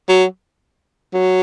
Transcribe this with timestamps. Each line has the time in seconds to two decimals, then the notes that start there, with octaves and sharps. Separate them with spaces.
0.09 F#3
1.13 F#3